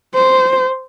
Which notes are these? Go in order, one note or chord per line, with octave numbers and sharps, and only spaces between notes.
C5